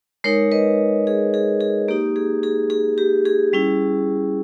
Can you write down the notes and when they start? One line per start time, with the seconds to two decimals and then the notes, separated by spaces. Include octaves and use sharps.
0.24 G#3 D#4 A#4 C#5
0.51 B4 D#5
1.07 G#4
1.34 G#4
1.61 G#4
1.88 A#3 D#4 G4
2.16 G#4
2.43 G#4
2.70 G#4
2.98 G4
3.25 G#4
3.53 G3 C#4 E4